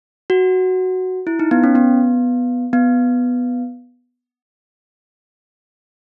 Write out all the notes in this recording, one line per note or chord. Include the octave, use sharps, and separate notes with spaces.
F#4
E4
D#4
B3
C#4
B3
B3